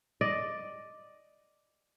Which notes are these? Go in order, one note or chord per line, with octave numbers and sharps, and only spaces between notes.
D5 D#5